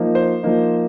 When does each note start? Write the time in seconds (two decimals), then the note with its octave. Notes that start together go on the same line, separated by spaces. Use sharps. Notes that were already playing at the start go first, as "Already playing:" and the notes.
Already playing: F3 A#3 D#4
0.15 C5
0.43 F3 A#3 D#4